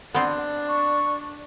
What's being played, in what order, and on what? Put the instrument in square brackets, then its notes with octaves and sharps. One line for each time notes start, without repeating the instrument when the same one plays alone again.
[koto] B3 C4 [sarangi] D4
[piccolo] C#6